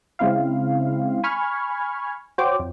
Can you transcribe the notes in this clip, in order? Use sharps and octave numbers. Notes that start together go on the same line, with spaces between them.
C#3 G#3 C4 E4 F5
G#5 B5 C#6 F6 G#6
F#4 C5 C#5 G5 D6
F2